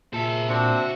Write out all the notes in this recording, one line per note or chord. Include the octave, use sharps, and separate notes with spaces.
A#2 G#4 C5 E5 A5
C4 D4 F#4 F#5